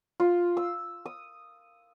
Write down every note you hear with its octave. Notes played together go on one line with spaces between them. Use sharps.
F4
E6
D#6